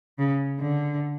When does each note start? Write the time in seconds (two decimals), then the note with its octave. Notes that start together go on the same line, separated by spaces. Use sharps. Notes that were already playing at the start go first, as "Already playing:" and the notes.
0.19 C#3
0.60 D3